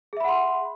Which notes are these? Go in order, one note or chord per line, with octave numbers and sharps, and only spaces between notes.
G#4 E5 F#5 B5 C6